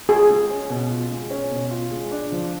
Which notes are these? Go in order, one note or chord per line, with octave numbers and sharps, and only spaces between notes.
F4 G#4
G#3
C#4
B2
F4
G#3
C#4
B2
F4
G#3
D4
F3